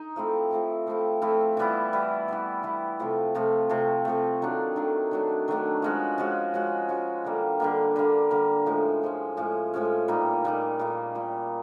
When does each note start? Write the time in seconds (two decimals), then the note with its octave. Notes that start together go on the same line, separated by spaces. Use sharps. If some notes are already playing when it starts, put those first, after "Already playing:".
Already playing: D#4
0.16 F3 A3 C4 E4
0.51 F3 A3 C4 E4
0.87 F3 A3 C4 E4
1.22 F3 A3 C4 E4
1.57 E3 G3 B3 E4
1.93 E3 G3 B3 E4
2.28 E3 G3 B3 E4
2.63 E3 G3 B3 E4
2.99 C3 F3 A3
3.35 C3 F3 A3
3.69 C3 F3 A3
4.05 C3 F3 A3
4.42 D#3 F#3 A3 D4
4.76 D#3 F#3 A3 D4
5.11 D#3 F#3 A3 D4
5.48 D#3 F#3 A3 D4
5.82 F3 G#3 C#4 F#4
6.18 F3 G#3 C#4 F#4
6.54 F3 G#3 C#4 F#4
6.89 F3 G#3 C#4 F#4
7.25 D3 G3 A#3
7.60 D3 G3 A#3
7.96 D3 G3 A#3
8.30 D3 G3 A#3
8.66 A2 F3 G#3 C#4
9.02 A2 F3 G#3 C#4
9.37 A2 F3 G#3 C#4
9.74 A2 F3 G#3 C#4
10.08 A#2 G3 A#3 D#4
10.44 A#2 G3 A#3 D#4
10.79 A#2 G3 A#3 D#4
11.15 A#2 G3 A#3 D#4